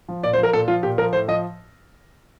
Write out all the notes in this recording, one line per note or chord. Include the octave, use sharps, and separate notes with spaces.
F3
A#2 D5
C5
F3
A#4
A#2 A4
F3 F4
A#2 G4
F3 A#4
A2 C5
F3 D#5